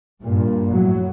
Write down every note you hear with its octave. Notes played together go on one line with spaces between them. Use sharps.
G2 A#2
A2 F#3